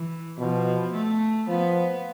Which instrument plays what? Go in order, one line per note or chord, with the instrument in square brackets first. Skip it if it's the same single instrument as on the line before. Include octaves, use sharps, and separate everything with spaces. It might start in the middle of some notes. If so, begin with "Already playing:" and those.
Already playing: [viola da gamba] E3
[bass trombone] B2 [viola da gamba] F3
[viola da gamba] A3
[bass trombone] F3 [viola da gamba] B3